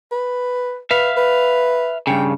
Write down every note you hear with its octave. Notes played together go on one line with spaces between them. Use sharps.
B4
B4 E5 F5
B4
G2 C#3 G5